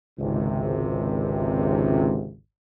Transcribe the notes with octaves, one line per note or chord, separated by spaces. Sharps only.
G#1 C#2 C3